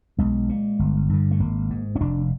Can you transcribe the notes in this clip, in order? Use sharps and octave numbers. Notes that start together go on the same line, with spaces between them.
B1 G#3
A#2
G1
G2 D3
A3
G#1 A#3
G#2
C#4
F1 D4